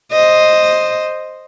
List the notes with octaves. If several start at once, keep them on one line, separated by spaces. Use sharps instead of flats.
C5 D#5